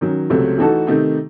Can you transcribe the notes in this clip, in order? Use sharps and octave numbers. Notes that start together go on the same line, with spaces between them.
D#3 F#3 C#4
C#2 C3 F#3 A3 C4
E3 A3 D#4 F#4 A4
C3 D#3 A3 D#4